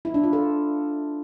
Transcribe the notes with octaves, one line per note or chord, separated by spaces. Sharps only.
E4
D4
F4
A4